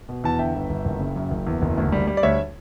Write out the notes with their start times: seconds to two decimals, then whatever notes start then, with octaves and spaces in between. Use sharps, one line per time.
0.09 B2
0.24 E2 A5
0.39 D3 E5 G5
0.55 G1
0.70 G1
0.85 F#1
1.00 C#3
1.16 F#2
1.31 F#1
1.47 E2
1.62 F#1
1.77 D2
1.92 G3
2.07 G3
2.17 D5
2.23 D2 C#5 E5